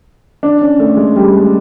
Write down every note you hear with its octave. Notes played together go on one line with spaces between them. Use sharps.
D4
C#4
A3
G#3
G3
G#3